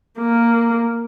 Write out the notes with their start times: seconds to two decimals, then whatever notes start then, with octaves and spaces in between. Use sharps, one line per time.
0.19 A#3